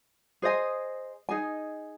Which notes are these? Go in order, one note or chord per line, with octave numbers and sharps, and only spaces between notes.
G#4 C5 D#5 G#5
D#4 G#4 D#5 G#5